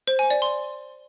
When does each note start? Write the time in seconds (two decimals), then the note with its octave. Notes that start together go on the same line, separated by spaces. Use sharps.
0.08 C5
0.19 G#5
0.30 D5
0.42 C6